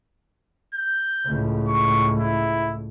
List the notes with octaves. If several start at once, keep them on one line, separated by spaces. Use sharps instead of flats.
G6
C#2 A2
C#6
E4